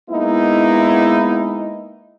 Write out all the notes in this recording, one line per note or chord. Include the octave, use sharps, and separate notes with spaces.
G#3 A#3 B3 D#4 E4